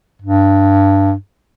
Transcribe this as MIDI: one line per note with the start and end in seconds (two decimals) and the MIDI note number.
0.22 1.13 43